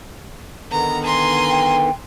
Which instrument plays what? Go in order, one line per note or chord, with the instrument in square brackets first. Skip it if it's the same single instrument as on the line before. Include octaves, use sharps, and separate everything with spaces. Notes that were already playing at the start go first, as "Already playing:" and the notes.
[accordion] D3 D#3 B3 [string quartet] A#5
[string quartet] G#5 A#5 C6
[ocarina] G5